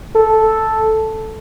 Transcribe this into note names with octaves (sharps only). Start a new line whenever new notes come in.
A4